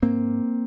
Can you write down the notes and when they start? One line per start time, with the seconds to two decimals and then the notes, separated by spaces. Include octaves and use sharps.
0.02 G#2 A#3 C4